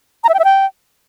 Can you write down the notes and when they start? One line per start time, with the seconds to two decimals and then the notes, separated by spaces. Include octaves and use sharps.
0.24 A#5
0.29 E5
0.34 G5
0.39 E5
0.44 G5